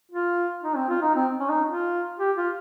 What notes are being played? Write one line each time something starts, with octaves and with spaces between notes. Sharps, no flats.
F4
D#4
C4
F4
D#4
C4
C#4
D#4
F4
G4
F4